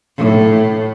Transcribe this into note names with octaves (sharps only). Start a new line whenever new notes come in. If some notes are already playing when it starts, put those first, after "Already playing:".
A2